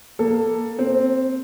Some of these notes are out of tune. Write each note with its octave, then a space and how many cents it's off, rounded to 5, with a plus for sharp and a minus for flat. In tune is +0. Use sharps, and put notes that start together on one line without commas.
A#3 +10 A4 +10
C4 +0 C5 +45